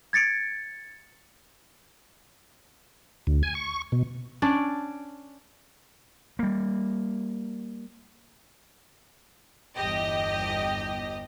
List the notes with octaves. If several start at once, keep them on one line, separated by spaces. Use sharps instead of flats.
G#6 A6 C#7 D7
D2
G#5
C#6
B2
C#4 D4 D5
G3 A#3
G1 E2 G4 D#5